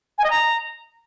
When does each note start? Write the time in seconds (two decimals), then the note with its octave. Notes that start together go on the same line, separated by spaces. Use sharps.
0.18 G#5
0.24 D#5
0.30 A#5